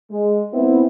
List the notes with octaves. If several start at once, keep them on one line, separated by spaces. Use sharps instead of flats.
G#3
B3 C4 E4